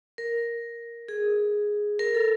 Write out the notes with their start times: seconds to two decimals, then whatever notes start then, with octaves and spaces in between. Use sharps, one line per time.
0.18 A#4
1.08 G#4
1.99 A#4
2.14 A4